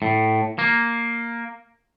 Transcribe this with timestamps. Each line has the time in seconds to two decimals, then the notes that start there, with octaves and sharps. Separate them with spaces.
0.02 A2
0.59 A#3